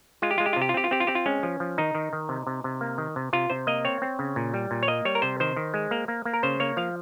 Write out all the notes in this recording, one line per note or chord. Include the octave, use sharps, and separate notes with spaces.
G#3 F4
G4
G#3 F4
G4
F4
C3
G4
F4
C4 G4
F4
C4 G4
F4
C4 G4
F4
G#3 C#4
F3
F3
D#3 D#4
D#3
D#3
C3
C3
C3
A#3
D#3
C3
C3 F4
C3 C5
A#3 D#5
C4 C#5
C4
C#3
A#2
G3
A#2
C#5
A#3 D#5
G3 C#5
A#4
C3 C5
D#3 C5
D#3
G#3
A#3
A#3
A#3
A#4
C#3 C5
A#3 C#5
F3 F5